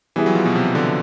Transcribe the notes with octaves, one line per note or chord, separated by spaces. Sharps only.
E3 G3 B3 E4 G#4
F#3
F3
B2
C3
D3